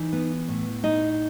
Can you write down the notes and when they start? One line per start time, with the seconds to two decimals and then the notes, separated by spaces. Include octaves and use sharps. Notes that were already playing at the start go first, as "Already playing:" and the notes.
Already playing: E3 D#4
0.13 B3
0.48 A2
0.84 D#4 D#5